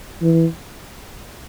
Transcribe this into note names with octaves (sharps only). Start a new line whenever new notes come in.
E3